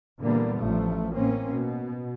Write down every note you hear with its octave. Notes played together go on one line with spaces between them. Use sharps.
A#2 D3 E3 G3 A#3 B3
A1 F3 A3
A2 A#3 C4 C#4
B2